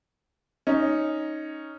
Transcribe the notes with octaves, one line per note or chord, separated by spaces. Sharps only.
C#4 D#4